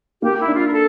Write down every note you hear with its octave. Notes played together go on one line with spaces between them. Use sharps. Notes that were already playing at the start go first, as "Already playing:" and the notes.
A#3 G4
E4
D4
F4
A#4
A4